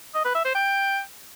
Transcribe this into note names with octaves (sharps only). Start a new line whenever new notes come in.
D#5
B4
E5
C5
G5